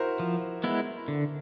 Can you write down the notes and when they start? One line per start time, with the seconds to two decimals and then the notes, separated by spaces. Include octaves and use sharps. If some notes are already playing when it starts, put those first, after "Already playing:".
Already playing: E4 F#4 A#4 C5
0.20 F3
0.64 G#3 B3 E4
1.08 D3